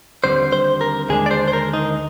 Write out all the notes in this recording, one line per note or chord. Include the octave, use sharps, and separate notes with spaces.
D#2 D3 G3 C4 C5
C5
A#4
D#2 D3 G#3 D4 G#4
D5
C5
C5
A#4
D#4